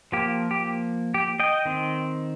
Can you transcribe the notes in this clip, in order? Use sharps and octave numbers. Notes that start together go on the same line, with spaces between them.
F3 A#3 G4
G4
G4
D#5 G5
D#3 C4